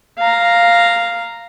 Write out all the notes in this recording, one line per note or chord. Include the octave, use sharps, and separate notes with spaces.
F5 A#5